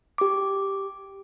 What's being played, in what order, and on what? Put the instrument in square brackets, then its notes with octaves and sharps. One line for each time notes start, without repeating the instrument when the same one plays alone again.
[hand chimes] G4 D6